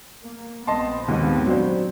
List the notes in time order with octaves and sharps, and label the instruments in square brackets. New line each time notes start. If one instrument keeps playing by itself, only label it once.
[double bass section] A#3
[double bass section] A#1 B3 C4 [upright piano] D#5 A5 C6
[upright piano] D#2 G#2
F#3 D4 C5